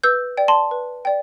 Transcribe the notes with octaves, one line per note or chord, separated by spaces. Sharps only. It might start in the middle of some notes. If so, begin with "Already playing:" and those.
B4 E6 G6
D5 G5
A5 C6
B4
D5 G5